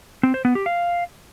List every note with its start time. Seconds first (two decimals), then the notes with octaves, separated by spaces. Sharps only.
0.23 C4
0.34 C5
0.45 B3
0.55 G4
0.66 F5